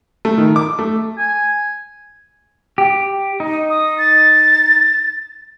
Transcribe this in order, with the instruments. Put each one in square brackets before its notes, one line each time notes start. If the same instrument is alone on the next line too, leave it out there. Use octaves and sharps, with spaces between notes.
[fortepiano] A3
D#3
D6
A3
[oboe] G#5
[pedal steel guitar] G4
D#4
[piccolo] D#6
A6